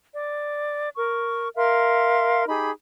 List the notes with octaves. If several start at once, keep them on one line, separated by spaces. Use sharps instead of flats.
D5
A#4 C#6
A#4 E5 F5 C6
D#4 G4 G#4 B5